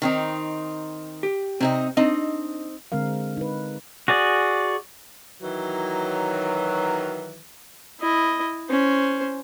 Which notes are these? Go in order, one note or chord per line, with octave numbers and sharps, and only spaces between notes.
D#3 C4 D#4
G4
C3 C4 D#4 D#5
C4 D4 D#4 D#5
D3 G#3 C4 A#4 F5
D#4 B4
F#4 G#4 D5
D#3 E3 F#3
E4 D#5
C#4 C5